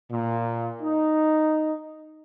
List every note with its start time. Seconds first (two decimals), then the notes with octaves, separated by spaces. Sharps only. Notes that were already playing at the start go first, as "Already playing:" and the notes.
0.11 A#2
0.82 D#4